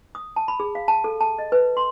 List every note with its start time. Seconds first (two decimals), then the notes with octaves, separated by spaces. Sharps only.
0.15 D#6
0.36 A5
0.48 B5
0.60 G#4
0.75 F5
0.88 A5
1.04 A4
1.21 A5
1.39 D#5
1.52 B4
1.77 C6